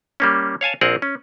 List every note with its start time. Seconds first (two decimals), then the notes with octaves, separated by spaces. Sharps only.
0.20 G3 A#3 C#4
0.61 C#5 F5 G#5 A5
0.81 A#1 C4 G#4 A#4 F#5
1.02 C#4